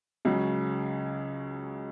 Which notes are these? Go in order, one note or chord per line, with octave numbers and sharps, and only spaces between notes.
C#2 C#3 F#3